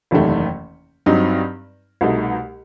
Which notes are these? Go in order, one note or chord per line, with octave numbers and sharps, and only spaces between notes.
F#1 E2 C3 D#3 A3
G2 F#3 C4 D#4
C2 B2 A3 D#4